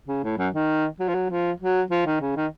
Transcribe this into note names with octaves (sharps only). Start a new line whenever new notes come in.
C#3
A2
F#2
D#3
F#3
F3
F#3
F3
F#3
F3
D#3
C#3
D#3